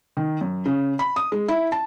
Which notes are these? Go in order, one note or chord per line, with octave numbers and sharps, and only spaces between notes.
D#3
F#2
C#3
B5
D#6
G#3
E4
A5